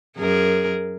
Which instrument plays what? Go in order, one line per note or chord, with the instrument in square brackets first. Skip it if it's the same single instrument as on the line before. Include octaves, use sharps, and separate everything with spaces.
[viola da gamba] F#2 G#4 A#4